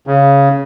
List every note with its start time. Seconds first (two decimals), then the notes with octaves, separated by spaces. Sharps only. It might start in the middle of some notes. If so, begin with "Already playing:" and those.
0.07 C#3